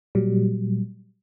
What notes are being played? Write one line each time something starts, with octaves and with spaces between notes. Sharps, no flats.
A#2 F#3 G3